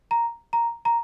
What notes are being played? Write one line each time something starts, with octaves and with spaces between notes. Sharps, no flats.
A#5
A#5
A#5